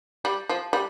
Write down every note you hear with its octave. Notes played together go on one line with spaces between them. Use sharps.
G3
F3
G3